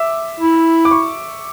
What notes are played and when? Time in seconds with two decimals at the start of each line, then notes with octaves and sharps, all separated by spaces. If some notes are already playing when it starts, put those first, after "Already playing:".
Already playing: E5 D6
0.40 E4
0.85 D6
0.91 C#6